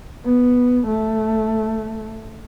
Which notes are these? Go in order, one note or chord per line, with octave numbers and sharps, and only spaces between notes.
B3
A3